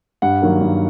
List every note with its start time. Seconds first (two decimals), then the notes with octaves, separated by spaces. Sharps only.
0.22 G2 F#5
0.42 D#3 F#3 A#3
0.61 G2